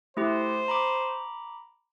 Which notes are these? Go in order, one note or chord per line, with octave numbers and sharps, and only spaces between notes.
A3 E4 G4 C5
A#5 B5 D6